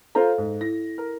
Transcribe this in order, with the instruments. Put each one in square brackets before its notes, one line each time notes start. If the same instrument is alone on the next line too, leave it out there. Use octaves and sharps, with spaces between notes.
[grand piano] F4 C5 A#5 [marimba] A4 F5
[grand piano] G#2
[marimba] E4 [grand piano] A#6
[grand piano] A#4